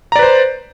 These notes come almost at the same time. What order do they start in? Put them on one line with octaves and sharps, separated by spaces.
A#5 D5 B4 C5